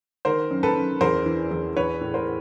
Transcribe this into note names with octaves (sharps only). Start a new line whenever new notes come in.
D#3 A#4 C5
F#2
A4 B4
F#2
E2 A#4 C5
E3
E2
E3 B4 C#5
A2
A#4 C5